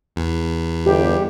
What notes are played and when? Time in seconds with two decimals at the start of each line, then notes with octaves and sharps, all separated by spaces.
0.16 E2
0.86 G1 G4